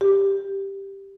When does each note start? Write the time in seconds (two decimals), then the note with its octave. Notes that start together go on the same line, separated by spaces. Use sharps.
0.01 G4